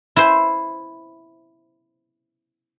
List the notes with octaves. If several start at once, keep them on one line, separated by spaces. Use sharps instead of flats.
E4 C5